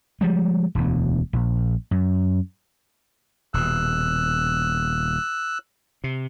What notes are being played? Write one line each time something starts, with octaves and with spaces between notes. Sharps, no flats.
F3 G3 G#3
E1 D2
A#1
F#2
D#1 B2 E6 F#6
C3